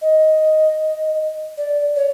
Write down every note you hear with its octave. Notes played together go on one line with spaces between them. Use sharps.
D#5
D5
C#5